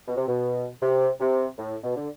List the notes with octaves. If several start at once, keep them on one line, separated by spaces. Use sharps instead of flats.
B2
C3
B2
C3
C3
A2
B2
D3